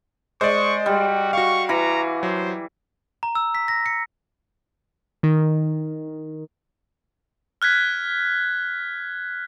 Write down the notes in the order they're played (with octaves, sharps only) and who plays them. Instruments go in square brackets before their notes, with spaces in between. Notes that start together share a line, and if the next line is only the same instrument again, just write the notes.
[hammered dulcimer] G#3 [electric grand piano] C5 D5 [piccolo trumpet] C#6
[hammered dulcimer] G3 [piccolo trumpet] F#4
[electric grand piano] F#4 F5 [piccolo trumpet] C#6
[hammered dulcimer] E3 [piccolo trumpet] A#5
[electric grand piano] F#3 [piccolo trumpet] C5
[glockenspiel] A#5
E6
B6
A#6
C#7
[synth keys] D#3
[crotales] F6 F#6 G#6 B6